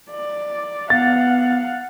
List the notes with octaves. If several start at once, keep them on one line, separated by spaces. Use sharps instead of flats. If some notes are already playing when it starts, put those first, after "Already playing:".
D5
B3 F5 F#5 A6